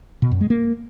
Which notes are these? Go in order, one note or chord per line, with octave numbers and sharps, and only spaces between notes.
B2
F#2
G#3
A#3